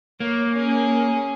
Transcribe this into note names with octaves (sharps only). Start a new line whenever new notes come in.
A#3 C#5
C#4 G#4